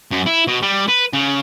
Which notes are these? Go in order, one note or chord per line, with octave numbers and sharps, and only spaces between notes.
F#2
E4
B2
G3
B4
C#3